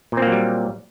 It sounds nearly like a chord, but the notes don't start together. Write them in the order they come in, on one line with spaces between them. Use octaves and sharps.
A#2 C4 A#3 F#3 G3